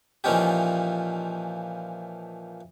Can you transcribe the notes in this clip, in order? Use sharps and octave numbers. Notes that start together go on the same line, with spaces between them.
A#2 E3 F3 C#4 D#4 G4